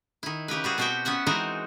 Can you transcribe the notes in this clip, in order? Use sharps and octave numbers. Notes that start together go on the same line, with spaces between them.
D#3 E4
C#3 G4 A#4 B4
G3 F#4 G#4
B2 C4 F#4 G4 E5 G5
B3 C#4 E5 F#5
E3 G#3 C4 D#4 F#4 A#4